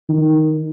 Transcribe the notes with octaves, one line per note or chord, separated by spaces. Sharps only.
D#3